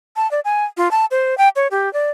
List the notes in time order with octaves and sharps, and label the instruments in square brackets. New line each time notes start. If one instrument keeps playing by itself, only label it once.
[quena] A5
D5
G#5
F4
A5
C5
G5
C#5
G4
D5